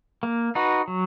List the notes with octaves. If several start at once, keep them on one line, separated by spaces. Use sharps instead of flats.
A#3
D#4 F#4 B4
F#3